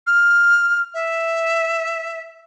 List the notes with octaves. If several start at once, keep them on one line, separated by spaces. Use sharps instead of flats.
F6
E5